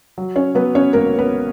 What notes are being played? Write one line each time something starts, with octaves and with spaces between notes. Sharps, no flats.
F#3
C#4 C#5
F#3 B3 B4
C#4 C#5
G#1 A#3 A#4
B3 B4